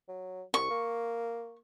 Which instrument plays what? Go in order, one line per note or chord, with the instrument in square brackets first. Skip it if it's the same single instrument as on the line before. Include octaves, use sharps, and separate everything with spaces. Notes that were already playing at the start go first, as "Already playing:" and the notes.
[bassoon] F#3
[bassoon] C2 [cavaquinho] C#6
[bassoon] A#3